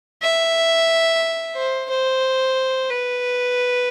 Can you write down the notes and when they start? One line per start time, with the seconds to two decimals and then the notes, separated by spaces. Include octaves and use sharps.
0.23 E5
1.55 C5
1.90 C5
2.90 B4